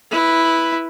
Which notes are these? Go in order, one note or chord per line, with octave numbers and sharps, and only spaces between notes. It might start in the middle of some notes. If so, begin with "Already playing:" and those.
E4 B4